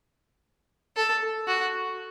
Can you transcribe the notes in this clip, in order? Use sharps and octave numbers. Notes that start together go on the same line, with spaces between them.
A4
F#4